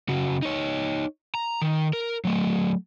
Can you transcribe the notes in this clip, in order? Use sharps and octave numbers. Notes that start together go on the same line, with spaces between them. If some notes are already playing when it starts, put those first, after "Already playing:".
C#3 F#4
D#4 C#5
A#5
D#3
A#4
F#3 A3